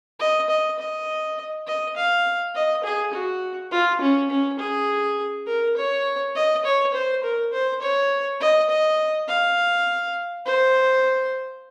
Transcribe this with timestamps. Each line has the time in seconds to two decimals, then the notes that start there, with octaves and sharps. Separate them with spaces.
0.20 D#5
0.49 D#5
0.79 D#5
1.67 D#5
1.96 F5
2.55 D#5
2.84 G#4
3.13 F#4
3.72 F4
4.01 C#4
4.30 C#4
4.59 G#4
5.47 A#4
5.77 C#5
6.35 D#5
6.65 C#5
6.94 C5
7.23 A#4
7.53 C5
7.82 C#5
8.41 D#5
8.69 D#5
9.28 F5
10.45 C5